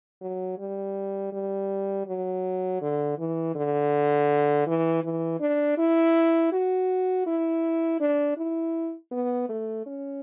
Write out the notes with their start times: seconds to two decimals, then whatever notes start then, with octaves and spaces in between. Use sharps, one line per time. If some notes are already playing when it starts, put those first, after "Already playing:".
0.21 F#3
0.59 G3
1.33 G3
2.07 F#3
2.81 D3
3.18 E3
3.55 D3
4.67 E3
5.04 E3
5.40 D4
5.78 E4
6.52 F#4
7.26 E4
8.00 D4
8.38 E4
9.12 B3
9.49 A3
9.86 C#4